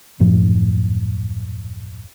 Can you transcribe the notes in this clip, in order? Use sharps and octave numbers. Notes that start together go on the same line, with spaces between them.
D#1 F#2 A2 F3